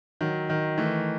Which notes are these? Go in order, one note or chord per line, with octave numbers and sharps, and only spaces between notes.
D#3 F#3
D#3
E3 A3